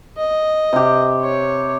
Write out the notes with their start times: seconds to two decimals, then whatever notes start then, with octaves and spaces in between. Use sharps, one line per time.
0.17 D#5
0.73 C3 G4
1.22 C#5